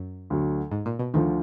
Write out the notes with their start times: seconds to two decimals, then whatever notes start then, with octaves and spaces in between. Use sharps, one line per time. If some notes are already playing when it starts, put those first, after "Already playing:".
Already playing: F#2
0.30 D2 D3 F#3
0.72 G#2
0.86 A#2
0.99 B2
1.14 D2 D3 D#3 F3